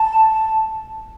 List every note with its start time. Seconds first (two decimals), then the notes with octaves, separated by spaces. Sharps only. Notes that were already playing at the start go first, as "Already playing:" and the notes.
Already playing: A5